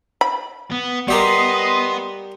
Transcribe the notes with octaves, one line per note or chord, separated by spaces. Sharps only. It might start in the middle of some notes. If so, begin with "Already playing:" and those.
B5
B3
G3 B3 G4 A#4 D#5 C6